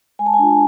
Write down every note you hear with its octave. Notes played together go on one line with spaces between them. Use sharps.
G#3 G#5
A5
G#5
D4 F4